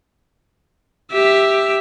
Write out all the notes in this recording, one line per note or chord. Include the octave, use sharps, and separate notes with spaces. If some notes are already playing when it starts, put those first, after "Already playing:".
G4 E5